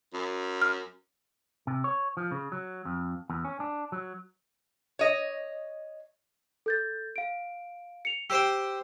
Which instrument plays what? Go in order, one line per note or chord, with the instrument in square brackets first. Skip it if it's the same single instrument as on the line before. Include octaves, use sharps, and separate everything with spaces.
[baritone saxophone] F#2
[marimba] F6
[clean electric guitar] C3
C#5
F3
C#3
F#3
F2
E2
C#4
D4
F#3
[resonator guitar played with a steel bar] C#5 D#5
[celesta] A4 G6 A6
F5 D7
C#7 F7
[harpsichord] G4 C5 G5 [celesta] E6